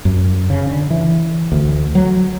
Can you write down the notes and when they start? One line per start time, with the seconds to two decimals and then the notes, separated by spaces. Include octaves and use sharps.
0.05 F#2
0.50 C#3
0.71 D3
0.90 E3
1.52 D2
1.95 F#3